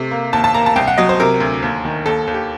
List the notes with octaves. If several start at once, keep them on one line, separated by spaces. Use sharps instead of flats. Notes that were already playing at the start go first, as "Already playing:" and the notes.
Already playing: C3 A3
A#3
D#2 A5
A5
A#3 A#5
A5
C2 G5
F#5
F#3 D#5
C5
C3 A#4
D2
D#2
D#3
D#2 A4
D#2
G4